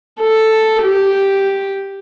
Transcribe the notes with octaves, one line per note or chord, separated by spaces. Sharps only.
A4
G4